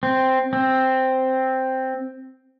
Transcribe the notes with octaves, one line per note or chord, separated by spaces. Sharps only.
C4
C4